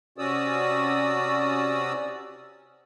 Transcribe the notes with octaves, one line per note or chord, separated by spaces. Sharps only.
C3 C#4 F#4 D5 D#6 E6